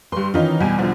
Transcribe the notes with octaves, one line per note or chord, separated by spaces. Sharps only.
G2 G3 B4 C6
D#3 E3 C#4 D#4 F4
E2 B2 G3 G#5
E2 D3 F3